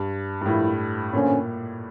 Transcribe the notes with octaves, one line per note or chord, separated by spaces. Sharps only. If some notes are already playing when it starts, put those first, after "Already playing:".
Already playing: G2
G2
A2 F3 A#3 E4
A#2 D3 F3 C#4